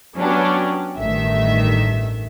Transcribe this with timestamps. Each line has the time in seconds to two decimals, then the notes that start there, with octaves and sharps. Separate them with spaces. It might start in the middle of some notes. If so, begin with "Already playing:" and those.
0.19 F#3 B3 C#4 D4 G4
0.97 A1 G2 D#3 A3 E5